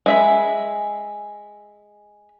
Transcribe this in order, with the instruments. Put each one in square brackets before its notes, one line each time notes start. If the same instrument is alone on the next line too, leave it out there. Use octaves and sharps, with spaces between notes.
[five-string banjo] G#3 E5 B5